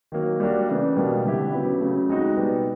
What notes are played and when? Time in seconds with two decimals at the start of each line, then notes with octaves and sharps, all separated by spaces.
0.12 D#3 F#3 A#3
0.40 G3 A#3 D4 F#4
0.69 C#3 E3 A3 D4
0.97 B2 G3 A#3 D4
1.25 D3 G3 C4 E4 G4
1.52 C#3 F#3 B3 E4
1.81 C#3 F#3 A3
2.09 G#3 C4 D#4 F#4
2.37 B2 G3 B3 D#4